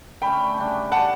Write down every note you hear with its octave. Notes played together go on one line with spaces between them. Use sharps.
D3 A3 C#4 G5 B5
C#3 G3 D4
G3 D4 G4 F#5 A5